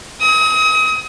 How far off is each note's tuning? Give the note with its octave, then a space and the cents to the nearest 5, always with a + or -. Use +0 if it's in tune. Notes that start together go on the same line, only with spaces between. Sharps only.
D#6 +35